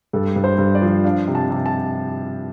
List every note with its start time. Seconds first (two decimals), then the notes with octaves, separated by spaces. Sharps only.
0.13 G2 A4
0.36 G2
0.44 C5
0.59 G2
0.75 D5
0.82 F3
1.04 D4 F5
1.28 C3
1.35 A5
1.50 C3
1.66 A5